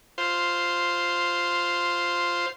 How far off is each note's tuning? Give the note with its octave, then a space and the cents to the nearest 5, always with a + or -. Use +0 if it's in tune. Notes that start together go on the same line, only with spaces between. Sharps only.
F4 +0 C5 +0